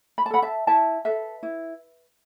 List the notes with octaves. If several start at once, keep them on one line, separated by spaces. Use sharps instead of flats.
B5
A5
A4 F#5 B5
E5 A5
E4 E5 A5
A4 B4 E5
E4